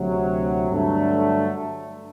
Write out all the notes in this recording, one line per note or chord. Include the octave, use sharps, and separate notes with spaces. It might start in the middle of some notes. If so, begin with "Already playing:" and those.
Already playing: D2 C3 F#3
G2 D3 F#3 A3 D4